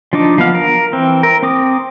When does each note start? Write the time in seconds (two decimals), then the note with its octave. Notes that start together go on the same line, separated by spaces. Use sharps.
0.13 F3 D4 D#4 D6
0.38 F3 B3 F5
0.54 A#4
0.93 E3 C4
1.23 A#4
1.43 C4 D6 D#6